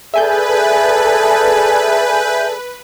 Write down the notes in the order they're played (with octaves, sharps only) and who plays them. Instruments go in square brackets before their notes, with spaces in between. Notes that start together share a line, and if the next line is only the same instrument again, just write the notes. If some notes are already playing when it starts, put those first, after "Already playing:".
[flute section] G#4 A4 D5 [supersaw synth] B4 [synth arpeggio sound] E5 G#5 G6